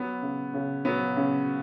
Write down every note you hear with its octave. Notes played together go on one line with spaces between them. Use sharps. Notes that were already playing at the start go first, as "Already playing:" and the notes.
Already playing: F#3 B3
C#3
C#3
F#3 B3
C#3